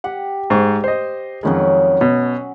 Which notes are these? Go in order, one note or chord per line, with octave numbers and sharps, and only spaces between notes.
G4 F#5
G#2 C5 C#6
C5 D#5
F2 D#3 F#3 G#3 C#4 B5
B2